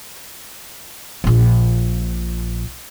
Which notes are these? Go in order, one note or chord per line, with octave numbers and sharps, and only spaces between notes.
A#1 A#2